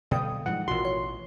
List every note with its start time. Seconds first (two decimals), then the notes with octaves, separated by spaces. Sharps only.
0.11 B2 D3 G3 A4 D5 F5 G5 D#6
0.46 G#2 E3 F3 G3 D#4 F#5
0.68 A1 B2 F4 F#4 A#4 C6
0.85 C#5